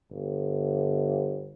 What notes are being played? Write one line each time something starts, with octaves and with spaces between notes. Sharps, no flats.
G1